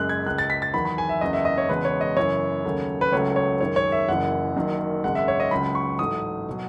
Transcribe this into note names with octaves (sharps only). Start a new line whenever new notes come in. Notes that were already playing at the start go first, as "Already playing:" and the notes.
Already playing: F#1 F#2 C#3 G#3 F#6
G#6
C#2 C#3 G#3 F#6
A6
B6
A6
E2 D#3 F#3 B5
B5
G#5
E5
F#1 E2 C#3 D#5
E5
D#5
C#5
E1 E2 C#3 G#3 B4
C#5
D#5
F#2 C#3 E3 C#5
D#2 C#3 F#3 A3
B4
C#2 C#3 F#3 A3 C#5
C#5
F#2 D#3 G#3 C#5
C#5
E5
F#1 F#2 C#3 E3 F#5
F#1 F#2 D#3 F#3
G#1 F#2 C#3 G#3 F#5
E5
C#5
D#5
C#2 C#3 F#3 B5
C#6
A1 G#2 F#3 A3 D#6
B2 F#3